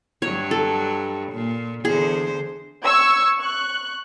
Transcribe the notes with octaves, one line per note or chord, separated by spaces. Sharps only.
G2 F#3 C#5
A4
A#2
E2 D3 G#4 C5
C#6 E6 G#6
C#6 F#6